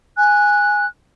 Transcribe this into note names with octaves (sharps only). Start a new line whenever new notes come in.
G#5 F#6